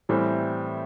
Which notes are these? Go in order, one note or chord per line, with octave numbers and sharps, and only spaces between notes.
A2 E3 G3 C4